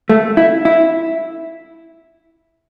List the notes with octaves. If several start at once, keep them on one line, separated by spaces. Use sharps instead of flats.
A3
E4
E4